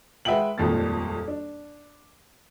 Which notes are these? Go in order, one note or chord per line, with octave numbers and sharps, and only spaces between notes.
G#3 B4 E5 F#5 G5 F#7
D#1 G#1 F2 A#2 A6
D4